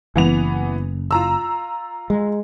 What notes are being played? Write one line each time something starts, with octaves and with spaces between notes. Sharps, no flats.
F#1 E3 B3 F7
F4 A#5 E6
G#3